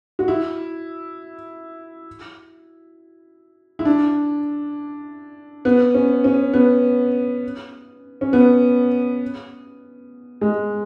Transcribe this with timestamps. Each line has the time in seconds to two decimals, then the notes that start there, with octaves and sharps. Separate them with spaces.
0.19 F#4
0.28 E4
3.79 E4
3.85 D4
5.65 B3
5.94 C#4
6.24 C#4
6.54 B3
8.21 C#4
8.33 B3
10.41 G#3